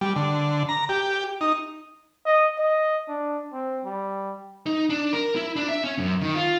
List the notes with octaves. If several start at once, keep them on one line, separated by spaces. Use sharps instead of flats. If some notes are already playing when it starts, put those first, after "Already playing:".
G3
D3
A#5
G4
D#4
D#5
D#5
D4
C4
G3
D#4
D4
A#4
E4
D4
E5
C#4
F#2
D#3
F4